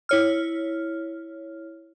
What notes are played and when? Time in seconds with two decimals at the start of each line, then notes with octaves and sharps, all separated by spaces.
0.09 E4 C#5 F6